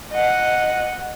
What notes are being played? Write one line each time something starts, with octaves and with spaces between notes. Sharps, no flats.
D#5 F#5